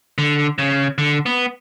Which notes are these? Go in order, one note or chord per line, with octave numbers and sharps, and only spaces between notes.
D3
C#3
D3
B3